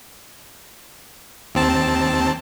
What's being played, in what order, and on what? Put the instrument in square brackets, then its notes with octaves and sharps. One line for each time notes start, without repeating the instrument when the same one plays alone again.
[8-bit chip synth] D#2 C4 A5